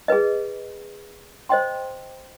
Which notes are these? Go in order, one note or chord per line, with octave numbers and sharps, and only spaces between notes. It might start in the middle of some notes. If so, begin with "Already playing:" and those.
G#4 B4 D#5
C5 D#5 G5 C6